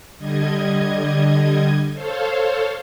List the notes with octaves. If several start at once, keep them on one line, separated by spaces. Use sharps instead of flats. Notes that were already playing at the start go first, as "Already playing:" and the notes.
D3 G3 D#5 G#6
A4 C5 C#5 F5